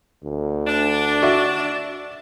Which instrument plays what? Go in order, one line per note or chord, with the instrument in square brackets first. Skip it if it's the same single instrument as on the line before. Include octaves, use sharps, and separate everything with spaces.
[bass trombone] D2
[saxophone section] D4
[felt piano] F#4 D5 E5